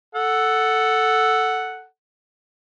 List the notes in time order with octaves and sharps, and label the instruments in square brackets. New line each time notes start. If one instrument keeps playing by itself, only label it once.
[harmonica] A4 F#5